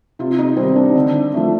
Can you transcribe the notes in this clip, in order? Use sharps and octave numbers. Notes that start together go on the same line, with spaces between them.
C3 F4
D#4
D#3 G3 C4
D4
D3
F3 A3